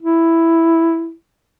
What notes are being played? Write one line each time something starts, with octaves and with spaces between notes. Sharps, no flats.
E4